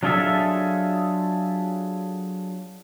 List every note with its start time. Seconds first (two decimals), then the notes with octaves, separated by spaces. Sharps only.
0.03 F#3 D4 F4 G#4 A4 E5